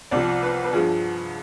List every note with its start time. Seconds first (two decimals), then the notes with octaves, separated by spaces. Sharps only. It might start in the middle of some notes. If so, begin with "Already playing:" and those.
0.11 C2 C3 F3 D5
0.42 B4
0.64 B4
0.73 G2 F3 G#4